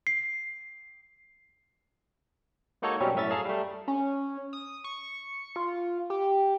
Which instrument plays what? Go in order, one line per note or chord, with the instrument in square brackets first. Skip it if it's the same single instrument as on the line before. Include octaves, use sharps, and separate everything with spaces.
[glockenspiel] C7
[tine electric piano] G#3 A#3 D#4 F#4 A4 C#5
B2 F#3 G3 C4 C#4
F#2 A2 C#4 E5 A6
G#4 A4 F5 A5 A#5
G3 A3
[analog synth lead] C#4
D#6
C#6
F4
G4